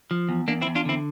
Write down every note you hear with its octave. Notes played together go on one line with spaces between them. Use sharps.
F3
E2
E2 A#3 D4
C4 E4
E2
D4 F4
D3 C4 E4